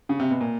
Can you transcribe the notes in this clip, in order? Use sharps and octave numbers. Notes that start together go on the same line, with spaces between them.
C#3
C3
B2
A#2